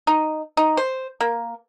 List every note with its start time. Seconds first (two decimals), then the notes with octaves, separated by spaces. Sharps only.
0.07 D#4
0.57 D#4
0.77 C5
1.21 A#3